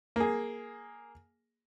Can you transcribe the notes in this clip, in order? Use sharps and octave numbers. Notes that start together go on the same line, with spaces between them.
A#3 G#4